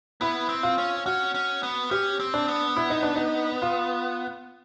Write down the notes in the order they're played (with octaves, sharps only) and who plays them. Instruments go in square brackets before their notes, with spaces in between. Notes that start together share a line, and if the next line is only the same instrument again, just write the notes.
[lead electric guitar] B3 [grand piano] E4
[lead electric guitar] C4
[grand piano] F4
[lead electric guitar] C#4
[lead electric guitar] C#4 [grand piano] F#4
[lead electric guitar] C#4
B3
[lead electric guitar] C#4 [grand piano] G4
[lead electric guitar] C4
[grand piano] D4
[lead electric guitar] B3
[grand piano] E4
D#4
D4
D#4
F4